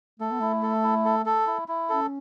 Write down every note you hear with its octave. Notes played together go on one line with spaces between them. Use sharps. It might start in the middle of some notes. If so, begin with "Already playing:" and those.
A3 A4
B3
A3 E4
A4
E4
A4
A4
E4
E4
C#4 A4